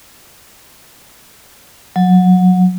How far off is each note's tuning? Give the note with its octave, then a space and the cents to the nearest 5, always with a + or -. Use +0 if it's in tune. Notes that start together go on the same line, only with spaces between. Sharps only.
F#3 -20